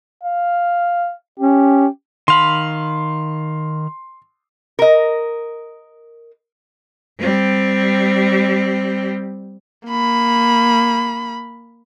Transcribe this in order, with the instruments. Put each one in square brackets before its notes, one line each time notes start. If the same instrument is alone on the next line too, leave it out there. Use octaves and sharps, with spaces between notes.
[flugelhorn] F5
[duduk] C#4 [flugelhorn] G4
[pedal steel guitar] D#3 F5 B5 [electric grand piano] C6
[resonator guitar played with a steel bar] A#4 D#5
[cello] G3 C4
[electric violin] A#3 B5